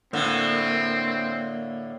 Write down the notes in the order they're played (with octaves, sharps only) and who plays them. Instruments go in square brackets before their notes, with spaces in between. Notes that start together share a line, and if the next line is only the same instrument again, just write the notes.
[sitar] A2 D3 [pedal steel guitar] A#3 [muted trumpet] C4